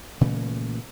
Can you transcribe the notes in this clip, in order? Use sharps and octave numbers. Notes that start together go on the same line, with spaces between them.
A#2 C#3 E3 A3